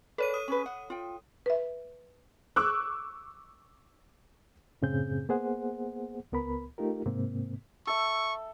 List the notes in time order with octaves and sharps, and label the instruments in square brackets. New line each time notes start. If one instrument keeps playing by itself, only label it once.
[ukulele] G#4 B4 D5 [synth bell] A4 C#5 D#7
[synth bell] D#6
[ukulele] C#4 G#4 B4
F#5
F4 G5
[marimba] B4 E5
[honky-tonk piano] C#6 D6 E6 F#6
[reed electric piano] F#2 A2 C#3 C4 G#4 G6
A#3 B3 G#4 C5 F#5
C#2 B3 A#4 B5
A3 D#4 F4 G4 A#4
G#2 C3 A#3 C4
[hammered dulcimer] A4 E5 [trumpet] C#6